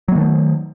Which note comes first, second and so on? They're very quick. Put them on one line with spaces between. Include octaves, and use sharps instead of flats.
F#3 A#3 D#3 A3